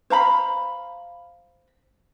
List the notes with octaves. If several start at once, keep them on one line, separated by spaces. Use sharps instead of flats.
C5 F5 A#5 B5